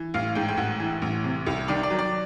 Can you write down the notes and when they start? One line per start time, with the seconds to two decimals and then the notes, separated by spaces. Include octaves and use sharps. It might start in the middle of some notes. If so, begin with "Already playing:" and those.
Already playing: E3
0.14 A1 F5
0.35 G#2 G5
0.49 G5
0.57 A1 F#5
0.80 E3
1.02 A1
1.24 C3
1.46 C2
1.68 D#3 D5
1.83 D5
1.90 F#3
1.99 D5